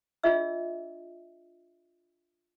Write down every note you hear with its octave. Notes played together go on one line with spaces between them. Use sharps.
D4 F4 G#4 D#5 E5 E6